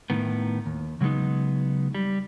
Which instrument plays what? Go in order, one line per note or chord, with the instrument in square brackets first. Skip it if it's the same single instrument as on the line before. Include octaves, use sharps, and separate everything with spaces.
[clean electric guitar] A2 D#3 B3
D#2
C#3 F#3 G#3 B3 D#4
G3